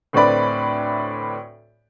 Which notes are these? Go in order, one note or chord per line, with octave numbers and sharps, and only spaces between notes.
D2 A2 C4 B4 D5 B5